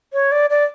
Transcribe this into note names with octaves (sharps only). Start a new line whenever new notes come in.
C#5
D5
D5